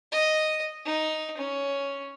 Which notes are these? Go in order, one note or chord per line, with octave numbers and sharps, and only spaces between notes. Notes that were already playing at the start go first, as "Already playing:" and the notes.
D#5
D#4
C#4